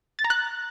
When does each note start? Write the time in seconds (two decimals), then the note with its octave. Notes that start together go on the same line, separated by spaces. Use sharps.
0.19 A6
0.24 A#5
0.30 F#6